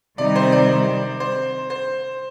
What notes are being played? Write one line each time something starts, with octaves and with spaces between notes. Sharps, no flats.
C3 D#3 G3 C4 D#4 D5
C5
D5
C5
C5